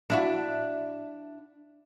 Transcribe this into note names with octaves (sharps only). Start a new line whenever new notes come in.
D4 E4 F#4